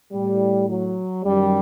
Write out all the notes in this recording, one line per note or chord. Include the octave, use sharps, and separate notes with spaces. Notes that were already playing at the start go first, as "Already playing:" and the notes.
A2 G3
F#3
F#2 D#3 G3